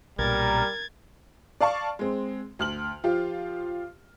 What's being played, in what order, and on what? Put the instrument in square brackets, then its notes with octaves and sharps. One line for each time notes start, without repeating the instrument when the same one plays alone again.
[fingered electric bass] B1 A#2 [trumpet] G3 [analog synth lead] A#4 [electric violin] G#6 A6
[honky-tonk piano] D5 F5 A5 C#6
G#3 C4
D2 F6 F#7
F3 F4 G4